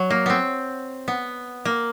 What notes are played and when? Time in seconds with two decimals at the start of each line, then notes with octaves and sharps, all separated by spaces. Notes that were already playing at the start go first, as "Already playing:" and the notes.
Already playing: F#3
0.10 A#3
0.26 B3 C4
1.08 B3
1.65 A#3